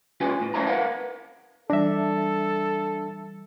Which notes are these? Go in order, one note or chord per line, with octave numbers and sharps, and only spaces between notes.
C#4 F4 G4 B4 G#5
A2
C#4 E4 C5 E5 A5 A#5
A#4 B4 F5 F#5
E3 G3 D4 A4 E5